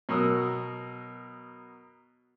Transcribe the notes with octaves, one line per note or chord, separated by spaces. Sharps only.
B2 F#3 A#4 D#6 E6